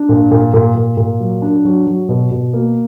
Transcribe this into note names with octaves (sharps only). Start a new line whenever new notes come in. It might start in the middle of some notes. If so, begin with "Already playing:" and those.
Already playing: D4
A#2
A#2
A#2
A#2
A#2
F#3
D4
F#3
F#3
B2
B2
A#3